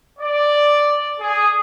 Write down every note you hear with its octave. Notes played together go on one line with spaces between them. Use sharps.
D5
G#4